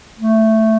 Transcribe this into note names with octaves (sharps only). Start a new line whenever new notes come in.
A3